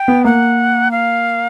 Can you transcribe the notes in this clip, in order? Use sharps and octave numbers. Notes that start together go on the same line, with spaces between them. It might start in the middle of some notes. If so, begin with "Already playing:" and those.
Already playing: G5
B3
A#3 F#5
F5